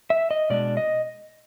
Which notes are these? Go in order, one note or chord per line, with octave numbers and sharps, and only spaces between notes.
E5
D#5
B2 G#3 D4 D5
D#5